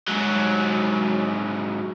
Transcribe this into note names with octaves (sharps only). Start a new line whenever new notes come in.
G#2 F#3